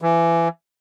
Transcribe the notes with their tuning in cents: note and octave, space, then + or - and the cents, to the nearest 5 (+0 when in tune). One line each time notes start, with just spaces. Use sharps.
E3 +25